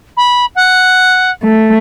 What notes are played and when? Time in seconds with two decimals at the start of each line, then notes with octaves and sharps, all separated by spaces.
0.17 B5
0.55 F#5
1.43 A3